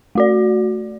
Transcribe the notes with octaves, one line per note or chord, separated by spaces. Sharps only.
A3 F#4 D5